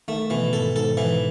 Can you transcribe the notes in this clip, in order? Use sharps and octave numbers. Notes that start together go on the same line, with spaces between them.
D#3 A3
B2 E3
G#2 A4
G#2 A4
E3